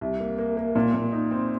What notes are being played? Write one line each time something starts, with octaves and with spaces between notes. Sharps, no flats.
C2
A#3
A#3
A#3
A#2
A#2
D#4
C4